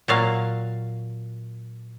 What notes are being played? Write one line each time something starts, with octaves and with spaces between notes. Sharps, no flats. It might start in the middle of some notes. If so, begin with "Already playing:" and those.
A#2 F#3 F5